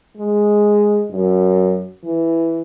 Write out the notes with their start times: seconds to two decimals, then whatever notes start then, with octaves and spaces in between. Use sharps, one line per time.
0.17 G#3
1.11 F#2
2.04 E3